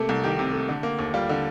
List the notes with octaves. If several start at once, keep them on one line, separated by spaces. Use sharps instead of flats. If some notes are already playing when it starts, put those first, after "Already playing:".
Already playing: C3 A3 A#3 A4
C2
D#3 G4
C3
A3
D3
A#3
D#2
G3 F4
D3